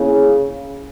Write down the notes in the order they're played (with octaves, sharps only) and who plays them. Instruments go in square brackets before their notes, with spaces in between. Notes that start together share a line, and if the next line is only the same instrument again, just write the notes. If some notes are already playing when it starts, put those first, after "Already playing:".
Already playing: [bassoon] C#3 [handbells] A#3 C#4 E4